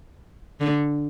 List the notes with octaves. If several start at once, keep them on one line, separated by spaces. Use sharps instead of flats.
D3